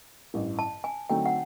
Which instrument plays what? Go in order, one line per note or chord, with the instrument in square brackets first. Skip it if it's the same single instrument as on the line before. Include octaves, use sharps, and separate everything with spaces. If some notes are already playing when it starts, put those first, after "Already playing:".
[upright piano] A1 G2 E3
[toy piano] A5
G#5
[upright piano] D3 F#3 A3 C4 D#4 [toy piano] G5
[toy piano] F#5